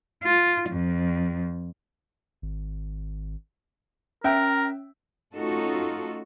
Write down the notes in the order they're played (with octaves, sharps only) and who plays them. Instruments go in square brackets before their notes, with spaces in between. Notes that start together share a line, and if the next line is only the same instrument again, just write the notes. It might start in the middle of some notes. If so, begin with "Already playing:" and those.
[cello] F4
F2
[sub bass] G#1
[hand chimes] C#4 [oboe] A#4 [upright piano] E5 G5
[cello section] A3 C#4 D#4 F4 F#4 A4